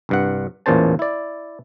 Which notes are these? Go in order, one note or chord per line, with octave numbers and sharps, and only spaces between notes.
C2 G2 F#5
A1 E2 A#2 C#4 C5 A5
E4 D5